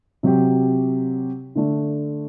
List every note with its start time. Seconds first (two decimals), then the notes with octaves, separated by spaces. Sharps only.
0.23 C3 F#3 C4 G4
1.56 D3 A3 D4